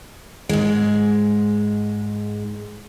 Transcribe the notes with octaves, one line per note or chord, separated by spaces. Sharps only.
G#2 G#3